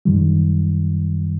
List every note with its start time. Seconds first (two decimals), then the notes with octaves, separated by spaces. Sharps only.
0.05 F#2 D#3 G3